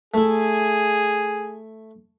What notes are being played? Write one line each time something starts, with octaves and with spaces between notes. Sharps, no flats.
A3 E4 G#4